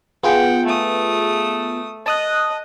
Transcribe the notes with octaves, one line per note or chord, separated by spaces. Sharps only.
B3 F4 G#4 F#5 G5
A3 D#6
D#5 A5 D#6 F#6